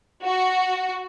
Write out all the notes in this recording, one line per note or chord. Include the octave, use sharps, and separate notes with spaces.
F#4